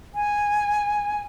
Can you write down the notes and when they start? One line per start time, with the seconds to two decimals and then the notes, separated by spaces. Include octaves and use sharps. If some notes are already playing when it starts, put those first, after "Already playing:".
0.15 G#5